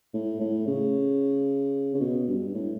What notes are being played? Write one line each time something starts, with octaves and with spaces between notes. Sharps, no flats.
A2
A2
C#3
C#3
B2
G2
A2